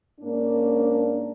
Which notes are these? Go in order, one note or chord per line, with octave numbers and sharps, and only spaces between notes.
G#2 A#3 C#4 D4